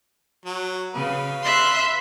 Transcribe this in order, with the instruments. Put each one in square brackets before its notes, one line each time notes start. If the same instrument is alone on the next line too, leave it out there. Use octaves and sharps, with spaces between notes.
[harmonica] F#3
[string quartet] C#3 [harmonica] B4 F5
[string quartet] E5 C6 F#6